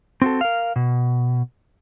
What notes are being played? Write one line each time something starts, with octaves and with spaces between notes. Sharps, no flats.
C4 F#4 A4
A#4 F5
B2